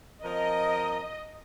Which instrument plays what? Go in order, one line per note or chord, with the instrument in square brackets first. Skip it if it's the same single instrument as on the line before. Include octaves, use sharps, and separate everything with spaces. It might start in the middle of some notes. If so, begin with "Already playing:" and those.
[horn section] F3 C4 A#4 [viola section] D#5